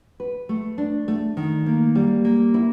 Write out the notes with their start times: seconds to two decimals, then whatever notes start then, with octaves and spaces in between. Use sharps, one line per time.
0.20 B4
0.49 A3
0.78 D4
1.08 A3
1.37 D#3
1.66 A#3
1.95 G3
2.25 A#3
2.54 E4